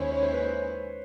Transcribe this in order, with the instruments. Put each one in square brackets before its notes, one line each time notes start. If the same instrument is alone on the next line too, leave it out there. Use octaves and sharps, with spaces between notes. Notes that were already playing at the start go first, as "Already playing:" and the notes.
Already playing: [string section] D#2 D#3 G#3 C#4 E4 [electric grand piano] C5 C#5
[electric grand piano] C#5
C5
B4
C5